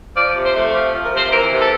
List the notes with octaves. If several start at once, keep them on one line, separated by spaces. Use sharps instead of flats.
F3 D5
C3
C5
A3
F3 G4
F3
A#4
C3
C5
E3 A#4
C3
A4